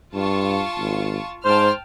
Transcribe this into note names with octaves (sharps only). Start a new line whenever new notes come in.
G2 F4 A5 C#6
G#1
G#2 C5 G5 A5 F6